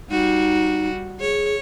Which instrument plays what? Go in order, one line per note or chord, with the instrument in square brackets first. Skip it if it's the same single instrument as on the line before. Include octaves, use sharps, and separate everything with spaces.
[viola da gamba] G3 F#4 [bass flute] D#4
[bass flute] G#4 [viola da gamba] C#5